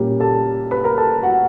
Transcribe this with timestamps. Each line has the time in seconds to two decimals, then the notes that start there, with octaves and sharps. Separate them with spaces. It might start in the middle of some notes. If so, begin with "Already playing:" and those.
Already playing: A#2 G3 A#3 C#4 G4
0.20 A4 A5
0.71 B4 B5
0.84 A#4 A#5
0.97 A4 A5
1.23 F#4 F#5